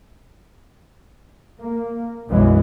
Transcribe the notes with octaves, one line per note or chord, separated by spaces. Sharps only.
A#3
B1 F#2 E3 G#3